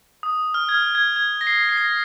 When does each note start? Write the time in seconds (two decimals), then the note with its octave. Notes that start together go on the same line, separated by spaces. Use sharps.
0.23 D#6
0.54 F6
0.69 G#6
0.74 F6
0.95 G#6
1.16 G#6
1.41 A#6
1.47 C7
1.69 C7
1.77 A#6